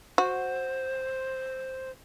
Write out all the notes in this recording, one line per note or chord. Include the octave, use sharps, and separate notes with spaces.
F#4 C5